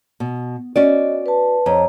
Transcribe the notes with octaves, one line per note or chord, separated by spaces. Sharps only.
B2
C#4 F#4 D5 D#5
B4 A5
F2 C#5 D#5 A#5